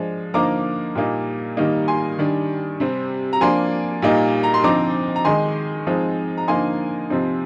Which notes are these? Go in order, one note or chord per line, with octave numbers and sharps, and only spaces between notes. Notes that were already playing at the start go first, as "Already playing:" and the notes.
Already playing: F3 G#3 D4
D3 F3 A#3 D#4 A#5 D6
A#2 G3 A#3 D#4
D#3 G3 A#3 D#4
G#5 C6
D#3 G3 D4
C3 G3 C4
A#5
F3 A#3 D4 G#5 C6
A#2 G3 A#3 D#4
A#5
C6
D3 F3 C4 D#4 A#5 D6
A#5
D#3 G#3 D#4 G#5 C6
F3 G#3 C4 D#4
A#5
D3 F3 A#3 D#4 G#5 C6
C3 F3 C4 D#4